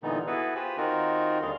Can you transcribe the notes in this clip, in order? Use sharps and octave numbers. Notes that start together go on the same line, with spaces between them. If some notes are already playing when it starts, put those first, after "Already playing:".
A#2 D3 E3 G3 B3 D#4
B3 E4 F#4 G#4 A4 B4
F4 G4 B4 C5 G#5 B5
D#3 C4 D#4 F4 F#4 A#4
D#2 D3 G3 G#4 F5 C6